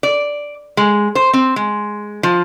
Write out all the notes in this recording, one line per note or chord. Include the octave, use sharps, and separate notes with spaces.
D5
G#3
C5
C4
G#3
F3